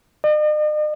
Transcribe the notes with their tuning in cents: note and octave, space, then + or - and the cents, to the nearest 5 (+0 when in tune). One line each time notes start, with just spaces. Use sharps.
D#5 -45